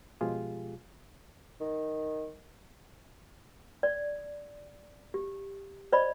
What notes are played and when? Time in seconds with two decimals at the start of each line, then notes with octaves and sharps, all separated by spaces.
0.21 B2 F3 G#3 F4 G4 G#4
1.60 D#3
3.83 D5
5.14 G4
5.93 C5 D5 D#5 B5